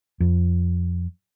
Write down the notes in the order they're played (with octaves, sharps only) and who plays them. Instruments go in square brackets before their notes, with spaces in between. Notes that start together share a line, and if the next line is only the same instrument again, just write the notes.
[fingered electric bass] F2